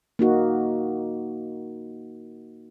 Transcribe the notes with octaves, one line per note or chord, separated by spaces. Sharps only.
A#3 D#4 F#4